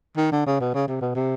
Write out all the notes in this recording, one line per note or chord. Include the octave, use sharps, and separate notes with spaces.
D#3
D3
C#3
B2
C#3
C3
B2
C3